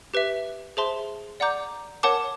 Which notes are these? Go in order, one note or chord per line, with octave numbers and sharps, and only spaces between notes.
G4 B4 E5
G#4 C5 E5 A5 C6
D5 F#5 A#5 D6 G6
A#4 C#5 F#5 A5 D6